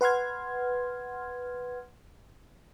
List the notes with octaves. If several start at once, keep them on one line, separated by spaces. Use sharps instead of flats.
B4 F#5 C6 F6 G#6